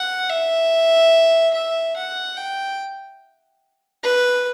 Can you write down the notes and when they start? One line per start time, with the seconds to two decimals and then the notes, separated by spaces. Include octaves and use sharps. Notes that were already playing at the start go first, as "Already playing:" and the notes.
Already playing: F#5
0.30 E5
1.54 E5
1.96 F#5
2.37 G5
4.03 B4